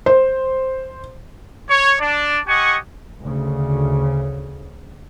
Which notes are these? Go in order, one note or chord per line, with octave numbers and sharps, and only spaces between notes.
C5
C#5
D4 D5
G4 D#5 F#5 G#5 C#6
D2 C#3